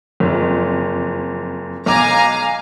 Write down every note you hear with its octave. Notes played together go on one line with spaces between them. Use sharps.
F#1 F2
B1 F5 G#5 A#5 D6